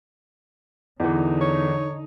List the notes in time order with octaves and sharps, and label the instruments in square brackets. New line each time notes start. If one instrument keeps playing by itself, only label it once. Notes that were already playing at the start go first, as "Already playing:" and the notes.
[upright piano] E2 E3 [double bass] D3 D#4
[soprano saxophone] C#5